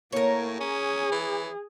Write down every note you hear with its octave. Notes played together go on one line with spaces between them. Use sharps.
A2 A#3 A#4 C#5
C#4 G#4
E3